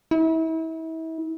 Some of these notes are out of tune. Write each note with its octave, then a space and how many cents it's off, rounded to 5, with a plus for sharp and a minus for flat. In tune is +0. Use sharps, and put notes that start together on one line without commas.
E4 -35